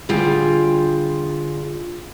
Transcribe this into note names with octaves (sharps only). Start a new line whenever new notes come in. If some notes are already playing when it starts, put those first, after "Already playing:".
D3 G3 F4 G#4 G5